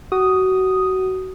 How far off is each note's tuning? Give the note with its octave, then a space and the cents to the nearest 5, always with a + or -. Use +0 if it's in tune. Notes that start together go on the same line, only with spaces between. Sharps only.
F#4 +25 D#6 +0